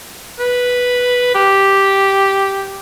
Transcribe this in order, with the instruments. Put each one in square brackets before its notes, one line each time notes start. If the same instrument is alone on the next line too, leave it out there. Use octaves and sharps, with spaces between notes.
[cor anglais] B4
G4